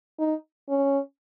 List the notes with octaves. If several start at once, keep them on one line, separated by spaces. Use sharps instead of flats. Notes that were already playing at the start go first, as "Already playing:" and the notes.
D#4
C#4